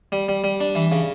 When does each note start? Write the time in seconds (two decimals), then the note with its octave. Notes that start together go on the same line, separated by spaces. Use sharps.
0.12 G3
0.29 G3
0.44 G3
0.61 D4
0.75 E3
0.92 C#3